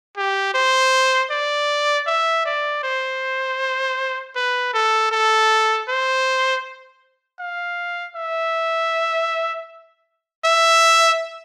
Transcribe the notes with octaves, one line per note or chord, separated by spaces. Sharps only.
G4
C5
D5
E5
D5
C5
B4
A4
A4
C5
F5
E5
E5